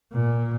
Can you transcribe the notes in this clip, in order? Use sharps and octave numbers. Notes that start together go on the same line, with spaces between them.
A#2